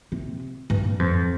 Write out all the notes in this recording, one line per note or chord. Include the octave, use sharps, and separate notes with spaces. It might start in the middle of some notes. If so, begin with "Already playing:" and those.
C3
G2
F2